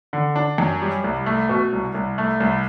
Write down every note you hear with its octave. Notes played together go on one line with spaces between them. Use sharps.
D3
D4
F#2
G3
C2
A3
B2
C2
C2
A3
C2